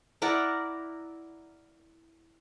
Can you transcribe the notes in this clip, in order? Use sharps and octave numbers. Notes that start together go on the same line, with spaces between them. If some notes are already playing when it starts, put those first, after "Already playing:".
E4 A#4 D5 F#5